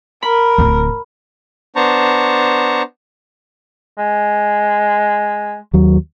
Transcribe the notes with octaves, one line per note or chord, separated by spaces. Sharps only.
A#4 B5
D1 D2
B3 D4 C5 A5 A#5 C#6
G#3
D#2 F#3